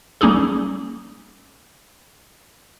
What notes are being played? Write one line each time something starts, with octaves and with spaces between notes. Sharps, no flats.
G3 A#3 C#4 D#4 G#4 A4